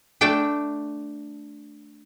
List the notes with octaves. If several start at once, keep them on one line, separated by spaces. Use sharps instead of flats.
A3 D4 G5 A5